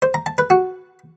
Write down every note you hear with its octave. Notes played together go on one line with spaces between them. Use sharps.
C5
A#5
A5
B4
F#4